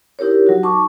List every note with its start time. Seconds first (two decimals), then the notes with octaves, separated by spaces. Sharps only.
0.19 D#4 E4 G4 A#4 C#5
0.47 F#3 F#4
0.63 D#4 A5 C#6 D6